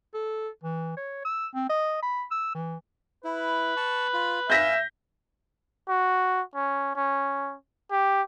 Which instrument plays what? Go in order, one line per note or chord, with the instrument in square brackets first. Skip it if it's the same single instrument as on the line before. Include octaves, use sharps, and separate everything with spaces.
[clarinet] A4
E3
C#5
E6
C4
D#5
B5
E6
E3
[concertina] E4 [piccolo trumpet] B4
[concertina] A5 C#6
F4 B5
[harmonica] E5 [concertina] F5 G#5 [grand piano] G6 A#6 B6
[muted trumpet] F#4
C#4
C#4
G4